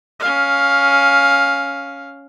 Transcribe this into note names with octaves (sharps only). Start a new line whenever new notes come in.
C#4 F5